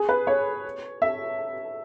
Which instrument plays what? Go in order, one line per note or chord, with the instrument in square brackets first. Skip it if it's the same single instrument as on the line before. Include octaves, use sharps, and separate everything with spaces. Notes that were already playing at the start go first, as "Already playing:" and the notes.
Already playing: [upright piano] G#4
B4
C#5
E5